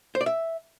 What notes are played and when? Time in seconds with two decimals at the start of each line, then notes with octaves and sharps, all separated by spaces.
0.15 C5
0.21 D5
0.26 E5